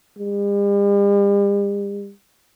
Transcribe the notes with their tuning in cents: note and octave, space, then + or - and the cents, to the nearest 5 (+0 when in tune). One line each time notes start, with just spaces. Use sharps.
G3 +45